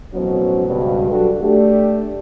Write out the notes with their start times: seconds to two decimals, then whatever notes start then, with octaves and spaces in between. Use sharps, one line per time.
0.14 A1 F2 B2 F#3 C#4 C5
0.68 C#2 G2 B2
1.11 F#3 G3 D4 F#4 G4 A4
1.42 A3 D4 G4